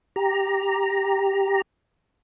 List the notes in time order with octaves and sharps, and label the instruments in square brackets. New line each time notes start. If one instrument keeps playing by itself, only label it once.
[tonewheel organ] G4 A#5